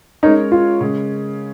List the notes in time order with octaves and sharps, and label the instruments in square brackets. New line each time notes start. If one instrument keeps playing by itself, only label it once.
[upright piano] G#3 C#4 A#4 C#5 [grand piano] D#4
[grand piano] F4
[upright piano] C#3 G#3 C#4